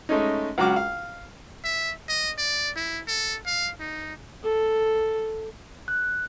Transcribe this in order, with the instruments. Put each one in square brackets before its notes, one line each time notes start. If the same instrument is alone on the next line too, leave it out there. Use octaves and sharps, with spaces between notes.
[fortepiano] G#3 A3 C#4 D#4
C#2 F#3 F#4 D6 F6
F5
[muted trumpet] E5
D#5
D5
E4
A4
F5
D#4
[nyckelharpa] A4
[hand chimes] F#6